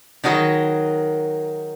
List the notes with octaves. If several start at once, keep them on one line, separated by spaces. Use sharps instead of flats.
D#3 F#3 D#4 F#4 G#4 B4